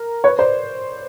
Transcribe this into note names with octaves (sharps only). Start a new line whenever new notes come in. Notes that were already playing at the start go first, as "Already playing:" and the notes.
Already playing: A#4
B4 C#5
C5 D5